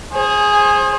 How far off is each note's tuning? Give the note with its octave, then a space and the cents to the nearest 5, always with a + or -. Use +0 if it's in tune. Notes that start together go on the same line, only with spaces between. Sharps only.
G#4 +0 C5 +40